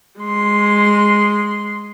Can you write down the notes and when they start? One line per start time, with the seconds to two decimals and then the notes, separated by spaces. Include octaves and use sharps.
0.20 G#3 C6